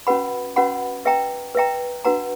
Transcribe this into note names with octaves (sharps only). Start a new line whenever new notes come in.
C#4 F#4 B4 F#5 B5
C#4 F#4 B4 F#5 B5
B4 E5 G5 A#5
B4 E5 G5 A#5
D4 F#4 B4 F#5 A#5